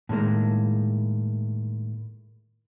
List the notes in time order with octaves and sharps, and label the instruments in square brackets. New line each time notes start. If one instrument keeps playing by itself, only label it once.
[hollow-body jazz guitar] A2 D#3 G#3 A#3